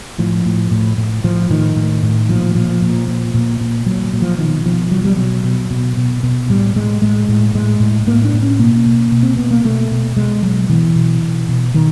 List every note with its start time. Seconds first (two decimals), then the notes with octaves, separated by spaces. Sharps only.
0.19 A2 F3
0.46 A2
0.71 A2
0.97 A2
1.24 A2 F3
1.50 A2 D#3
1.76 A2
2.03 A2
2.29 A#2 F3
2.55 A#2 F3
2.82 A#2
3.08 A#2
3.34 A#2
3.61 A#2
3.86 A#2 F#3
4.04 F#3
4.13 A#2
4.22 F3
4.39 B2 D#3
4.65 B2 F3
4.91 B2 F#3
5.05 G3
5.17 B2 F#3
5.44 B2
5.70 B2
5.97 B2
6.23 B2
6.50 A2 G3
6.76 A2 G#3
7.02 A2 G#3
7.29 A2
7.54 A2 G#3
7.80 A2
8.07 A2 A#3
8.25 D4
8.33 A2
8.42 C#4
8.59 B2 A#3
8.86 B2
9.12 B2
9.23 C4
9.36 B2 B3
9.51 A#3
9.64 B2 A3
9.91 B2
10.16 B2 G#3
10.43 B2 F#3
10.69 B2 E3
10.95 B2
11.22 B2
11.48 B2
11.74 B2 D#3